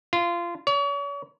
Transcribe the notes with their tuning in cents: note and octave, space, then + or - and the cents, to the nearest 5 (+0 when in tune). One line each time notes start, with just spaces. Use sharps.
F4 -20
C#5 +40